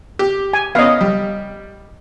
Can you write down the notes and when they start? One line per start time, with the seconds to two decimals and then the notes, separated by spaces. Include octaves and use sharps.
0.19 G4
0.53 G#5
0.75 B3 C#4 D#5 F5
1.01 G3